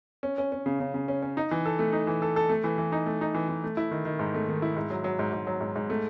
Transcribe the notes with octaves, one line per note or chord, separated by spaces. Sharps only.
C#4
C#4
C#4
C#3
C#3
C#3
C#4
C#4
D#4
E3
A4
A3
D#4
E3
A4
A4
A3
E3
E3
D#4
A3
D#4
E3
E3
A3
E4
D#3
D#3
G#2
A3
D#3
E4
G#2
F#3
F#3
G#2
G#2
F#3
G#2
G#2
A3